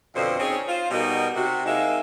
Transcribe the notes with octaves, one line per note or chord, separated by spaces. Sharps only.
F2 B2 D3 C5
C4 C#4 D#4 G#4 C#5
F4 C5
B2 G3 D#4 F#4 A#4
C3 F#4
G#3 A#3 C4 D#4 E5